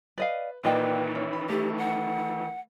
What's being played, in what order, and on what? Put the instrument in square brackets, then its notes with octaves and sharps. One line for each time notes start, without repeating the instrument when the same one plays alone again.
[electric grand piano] B4 [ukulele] D5 D#5 F5
[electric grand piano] A#2 A#3 D5 [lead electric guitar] D#3 E3 [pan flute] B4 [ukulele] D#5 G5
[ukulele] C#4
[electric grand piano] B5
[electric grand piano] A3 A4 [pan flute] G4
[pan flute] F#5